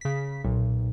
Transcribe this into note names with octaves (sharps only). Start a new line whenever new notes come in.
C#3 B6
B1 A#2